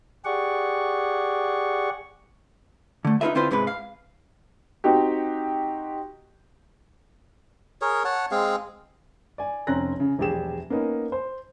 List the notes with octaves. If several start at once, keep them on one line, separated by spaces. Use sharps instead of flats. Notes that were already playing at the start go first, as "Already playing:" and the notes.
G4 G#4 D5 F#5 C#6
D3 A3
D#4 F4 F#4 G#4 B4 E5
D3 C4 E4 F4 B4 C5
G#2 C3 G#3 B4
F5
C4 D#4 F#4 G4
G#4 A#4 C#5
C#5 F#5 A5
G#3 C4 G#4 F5
D5 G#5
F1 C4 C#4 A#5 F#6 A#6
C#3
E1 A#1 G3 G4 G#4 E7
A#3 B3 C#4 D#4
C5